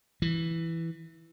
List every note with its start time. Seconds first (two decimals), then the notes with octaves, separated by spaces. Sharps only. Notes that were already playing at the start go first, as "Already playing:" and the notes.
0.22 E3